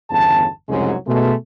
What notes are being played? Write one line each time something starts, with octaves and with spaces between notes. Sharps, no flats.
G1 E2 C#3 A5
C2 F2 G#2 C#3 F#3 G#3
B2 G#3 A3